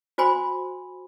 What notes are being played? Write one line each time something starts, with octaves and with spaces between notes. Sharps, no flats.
F#4 C5 G#5 B5 C6